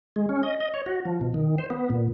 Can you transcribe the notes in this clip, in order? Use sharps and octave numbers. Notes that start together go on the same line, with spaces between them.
G#3
C#4
D#5
D#5
C#5
F#4
F3
B2
D#3
C5
B3
A#2